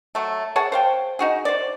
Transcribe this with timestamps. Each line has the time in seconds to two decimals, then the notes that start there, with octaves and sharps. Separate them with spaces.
0.15 F#3 A3
0.56 G#4 C#5 F#5 A5
0.72 C5 F5 G5
1.19 D#4 F#4 G#4
1.45 C5 D5